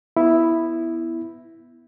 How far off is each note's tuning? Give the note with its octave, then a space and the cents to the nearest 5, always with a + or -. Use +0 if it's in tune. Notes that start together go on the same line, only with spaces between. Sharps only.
B3 +0 E4 +0